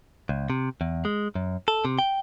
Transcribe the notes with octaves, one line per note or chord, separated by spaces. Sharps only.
C#2
C3
E2
G#3
F#2
A4
C3
G5